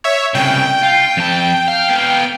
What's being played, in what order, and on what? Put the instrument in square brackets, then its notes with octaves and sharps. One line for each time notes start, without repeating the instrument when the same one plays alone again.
[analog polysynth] C#5 E5
[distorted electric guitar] C2 C#3 [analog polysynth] G5
[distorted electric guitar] F4
F2 A5
F5
B3 F5